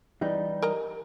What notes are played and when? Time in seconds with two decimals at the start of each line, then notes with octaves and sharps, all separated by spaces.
0.21 E3 G3 D#4
0.62 A#4 D#5 A#5